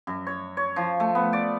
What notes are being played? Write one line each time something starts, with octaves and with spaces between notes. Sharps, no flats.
F#2
C#5
C#5
F3
A3
B3
D5